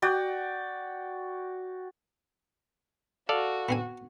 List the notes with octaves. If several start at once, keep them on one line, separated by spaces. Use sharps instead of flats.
F#4 D5 G5
F#4 A4 D5 F5
B3 C4 G#5